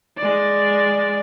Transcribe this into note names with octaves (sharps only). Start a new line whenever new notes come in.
G#3 D5